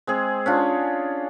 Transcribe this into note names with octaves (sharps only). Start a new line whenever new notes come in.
G#3 C4 G#4
C#4 D4 F4